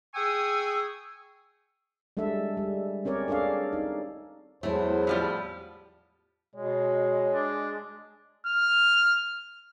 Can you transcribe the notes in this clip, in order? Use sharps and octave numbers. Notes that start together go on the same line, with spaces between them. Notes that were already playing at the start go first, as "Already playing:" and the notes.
G#4 G5 G#5 C#6 D#6 E6
G3 G#3 D4 A4 E5
G3
C4 C#4 A#4 C#5 D5
D4 G#4 A4 D5 F5
D#4
E2 F#3 G#3 A3 E4 C5
A2 F3 G3
B2 G#3 C#5
D4
F6